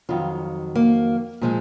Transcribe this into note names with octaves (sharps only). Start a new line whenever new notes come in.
F2 D#3 F#3 F4
A#3
A#2 F3 G#3